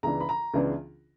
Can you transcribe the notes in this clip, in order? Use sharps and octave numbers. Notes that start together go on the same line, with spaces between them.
C#2 C#3 E3 B3 D4 A#5
B5
A#5
C#2 C#3 E3 B3 D4